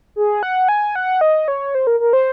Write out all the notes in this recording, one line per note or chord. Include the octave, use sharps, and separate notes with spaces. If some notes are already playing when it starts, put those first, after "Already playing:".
G#4
F#5
G#5
F#5
D#5
C#5
C5
A#4
A#4
C5